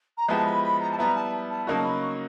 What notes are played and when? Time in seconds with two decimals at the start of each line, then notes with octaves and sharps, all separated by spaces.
0.18 A#5
0.28 F3 G#3 B3 E4 G4 A5
0.46 B5
0.64 B5
0.80 A#5
0.92 A5
0.98 G3 B3 E4 A#5
1.16 A5
1.50 A5
1.66 C#3 F#3 A#3 D#4 F#4 A5
1.84 B5
2.02 C#6